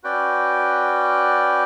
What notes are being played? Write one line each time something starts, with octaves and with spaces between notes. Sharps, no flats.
C#4 F#4 B4 D5 G5